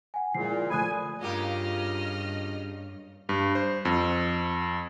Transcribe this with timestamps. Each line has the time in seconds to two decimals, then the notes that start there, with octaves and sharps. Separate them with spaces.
0.14 F#5 G#5
0.35 A#2 F3 G#3 E4 C7
0.70 F3 A3 G#5 B5 D#6 F#6
1.21 G2 C#3 A#3 F4 G4 D#5 F6
3.29 G2
3.55 C5
3.85 F2